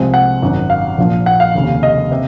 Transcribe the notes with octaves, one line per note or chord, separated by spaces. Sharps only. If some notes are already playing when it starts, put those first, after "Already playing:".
Already playing: C2 C3 F3 G#3 C4
F#5
G#1 F#2 D#3
F5
A#1 A#2 F3
F#5
F5
F1 D#2 C#3
D#5
C3